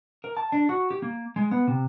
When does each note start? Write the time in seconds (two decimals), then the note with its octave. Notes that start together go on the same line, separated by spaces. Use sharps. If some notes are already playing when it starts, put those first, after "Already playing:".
0.24 A#4
0.37 A5
0.52 D4
0.69 F#4
0.91 G4
1.02 A#3
1.36 G#3
1.51 B3
1.67 C3